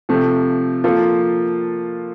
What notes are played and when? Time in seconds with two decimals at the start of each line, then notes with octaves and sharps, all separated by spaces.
0.09 C3 F3 A3
0.84 F3 A#3 F4 A4